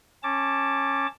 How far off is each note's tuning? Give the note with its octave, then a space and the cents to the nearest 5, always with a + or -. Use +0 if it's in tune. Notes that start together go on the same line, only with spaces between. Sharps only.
C#4 -20 A5 +0 D6 +0